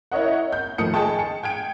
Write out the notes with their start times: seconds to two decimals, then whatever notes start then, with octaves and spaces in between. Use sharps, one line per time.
0.12 E4 A#4 C#5 D#5 F#5
0.53 G6
0.78 A2 D#3 F3 D#6 C#7
0.94 G#4 D#5 G5 A5
1.19 C#7
1.43 G5 G#6 D7